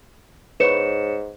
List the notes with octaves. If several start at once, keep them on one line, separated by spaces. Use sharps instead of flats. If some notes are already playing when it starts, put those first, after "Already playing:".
G#2 B4 C#5 C#6 C#7 E7